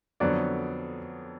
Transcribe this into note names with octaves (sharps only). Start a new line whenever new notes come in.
F2 D3 F#3 B3 D5